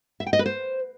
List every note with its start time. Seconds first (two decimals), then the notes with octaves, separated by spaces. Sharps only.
0.20 E5
0.27 G5
0.33 D#5
0.39 B4
0.46 C5